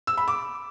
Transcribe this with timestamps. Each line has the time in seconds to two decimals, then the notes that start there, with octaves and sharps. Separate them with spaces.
0.07 E6
0.17 B5
0.28 D6